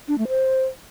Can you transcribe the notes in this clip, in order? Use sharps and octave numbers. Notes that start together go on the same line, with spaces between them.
D4
A3
C5